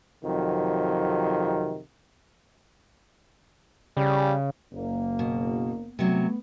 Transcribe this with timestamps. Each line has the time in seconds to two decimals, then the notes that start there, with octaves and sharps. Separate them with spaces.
0.24 F2 C3 D#3 F#3
3.97 C#3 G3
4.73 F#1 A#3
5.19 B2
5.99 C3 F#3 A3 B3